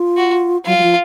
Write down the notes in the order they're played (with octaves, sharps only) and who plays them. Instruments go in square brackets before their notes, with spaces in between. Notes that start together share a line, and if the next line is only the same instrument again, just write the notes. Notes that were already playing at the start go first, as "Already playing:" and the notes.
Already playing: [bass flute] F4
[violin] F#4
[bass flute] F#3 [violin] F4
[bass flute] F#3
F3